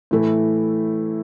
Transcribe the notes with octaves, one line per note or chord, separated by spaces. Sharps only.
A2 E3 A3 E4